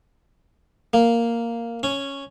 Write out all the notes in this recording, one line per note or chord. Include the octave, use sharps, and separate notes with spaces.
A#3
C#4